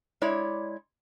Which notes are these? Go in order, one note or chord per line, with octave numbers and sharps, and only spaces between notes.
G#3 E4 C#5 D5